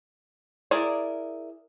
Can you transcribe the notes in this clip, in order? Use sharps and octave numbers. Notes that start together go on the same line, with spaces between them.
E4 G#4 A#4 D5